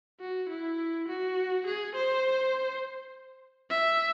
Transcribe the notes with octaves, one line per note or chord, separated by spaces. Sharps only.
F#4
E4
F#4
G#4
C5
E5